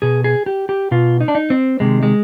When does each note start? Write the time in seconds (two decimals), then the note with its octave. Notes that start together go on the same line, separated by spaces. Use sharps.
0.02 B2 G#4
0.24 G#4
0.46 G4
0.69 G4
0.91 B2 F4
1.21 D#4
1.28 D4
1.35 D#4
1.50 C4
1.80 C3 D#3 G#3
2.03 G#3